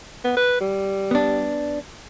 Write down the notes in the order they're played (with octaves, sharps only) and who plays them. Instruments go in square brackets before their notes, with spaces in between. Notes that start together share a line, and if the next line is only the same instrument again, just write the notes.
[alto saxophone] B3
B4
G3
[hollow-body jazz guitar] B3 D4